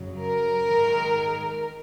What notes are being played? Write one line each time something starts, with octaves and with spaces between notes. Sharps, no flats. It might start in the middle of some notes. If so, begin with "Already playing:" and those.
Already playing: F#2 C#3 F#3
A#4
G#2 D#3 G#3